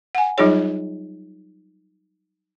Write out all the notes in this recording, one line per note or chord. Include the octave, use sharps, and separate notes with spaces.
F#5 G#5
F#3 G3 D#4 F4 G#4 C#5